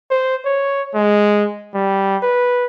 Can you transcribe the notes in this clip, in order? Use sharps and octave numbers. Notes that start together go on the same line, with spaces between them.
C5
C#5
G#3
G3
B4